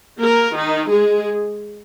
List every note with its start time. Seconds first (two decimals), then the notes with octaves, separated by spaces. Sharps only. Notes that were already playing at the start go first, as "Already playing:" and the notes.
0.20 A#3 A#4
0.55 D#3 D#4
0.90 G#3 G#4